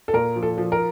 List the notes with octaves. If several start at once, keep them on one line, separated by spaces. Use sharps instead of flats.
A4
A#2 A#4
F3
A4
F3
A#4